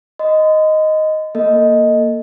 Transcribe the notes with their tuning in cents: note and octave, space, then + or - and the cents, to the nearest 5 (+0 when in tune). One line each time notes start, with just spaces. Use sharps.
D#5 +0 C6 -40
A#3 +0 A4 +20 D#5 +0